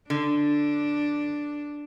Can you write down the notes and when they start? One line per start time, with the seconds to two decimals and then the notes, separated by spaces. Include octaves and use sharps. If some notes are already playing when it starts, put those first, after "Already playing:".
0.10 D3 D4